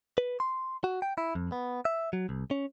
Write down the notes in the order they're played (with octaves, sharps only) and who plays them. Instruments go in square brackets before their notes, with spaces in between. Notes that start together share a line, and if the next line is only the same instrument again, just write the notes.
[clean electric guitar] B4
C6
F#4
G5
E4
F2
B3
E5
F#3
C2
C#4